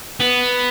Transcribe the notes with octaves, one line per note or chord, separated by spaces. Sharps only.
B3